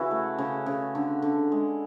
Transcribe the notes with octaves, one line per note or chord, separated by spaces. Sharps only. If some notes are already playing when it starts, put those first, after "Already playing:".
Already playing: C#3 E3 E4 F#4
A3
C#3
C#3
D3
D3
G#3